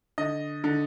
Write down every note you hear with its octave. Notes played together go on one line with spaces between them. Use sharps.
D3 D#5
D3